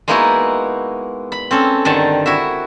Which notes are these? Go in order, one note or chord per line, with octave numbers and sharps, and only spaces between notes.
G#3 A#3 B3 D#4 E4 F#4
B5
C4 C#4 A4
G2 D3 D#3 F#5 A5
E4 F#4 E5